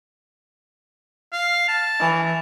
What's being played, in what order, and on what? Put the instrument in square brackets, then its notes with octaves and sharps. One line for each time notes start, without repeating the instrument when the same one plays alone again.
[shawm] F5
A5
[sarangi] E3